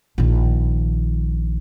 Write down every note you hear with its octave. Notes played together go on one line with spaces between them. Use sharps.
A#1 D#3